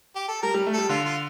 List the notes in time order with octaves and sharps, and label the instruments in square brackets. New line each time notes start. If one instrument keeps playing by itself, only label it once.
[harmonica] G4
A4
[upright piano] G3 [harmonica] A#4
[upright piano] G3
A3
[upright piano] G3 [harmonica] A4
[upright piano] D3 [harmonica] F4
[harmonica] F4